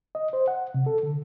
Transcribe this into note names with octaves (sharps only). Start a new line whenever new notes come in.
D#5
C5
F#5
C3
A4
D3